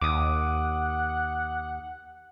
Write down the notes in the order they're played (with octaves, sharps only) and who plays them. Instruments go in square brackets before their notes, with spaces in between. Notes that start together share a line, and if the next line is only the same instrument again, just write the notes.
[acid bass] D#2 [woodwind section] F#5 [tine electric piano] D6 D#6